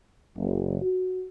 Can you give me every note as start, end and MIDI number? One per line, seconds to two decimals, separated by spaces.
0.36 0.80 30
0.82 1.25 66